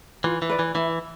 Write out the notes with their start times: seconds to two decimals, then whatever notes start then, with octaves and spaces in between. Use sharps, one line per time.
0.24 E3 F4
0.42 E3
0.50 B4 D5
0.59 E3
0.75 E3 E4